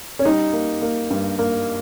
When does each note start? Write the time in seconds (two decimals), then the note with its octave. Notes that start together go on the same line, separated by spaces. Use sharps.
0.19 C#4
0.25 G3 D#4
0.53 A#3
0.82 A#3
1.10 G2
1.39 A#3